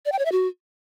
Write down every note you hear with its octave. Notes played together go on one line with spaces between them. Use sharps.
D5
G5
C#5
E5
F#4